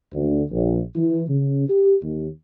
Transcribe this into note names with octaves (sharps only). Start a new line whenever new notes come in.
D2
A#1
E3
C#3
G4
D#2